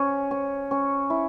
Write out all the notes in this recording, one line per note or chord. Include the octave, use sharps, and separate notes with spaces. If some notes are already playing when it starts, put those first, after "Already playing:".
Already playing: C#4
C#4
C#4
E4